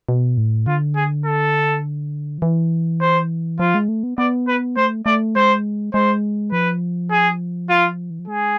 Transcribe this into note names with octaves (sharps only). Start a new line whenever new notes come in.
B2
A2
D3 F4
G#4
A4
F3
E3
C5
F3 F4
G#3
A3
B3
B3 D5
B4
A3 C5
A3 D5
G#3 C5
G#3 C5
F3 B4
G#4
F4
E3
F3
G#3 G#4